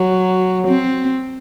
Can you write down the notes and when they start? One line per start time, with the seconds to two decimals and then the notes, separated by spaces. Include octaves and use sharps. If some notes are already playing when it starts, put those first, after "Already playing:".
Already playing: F#3
0.67 C4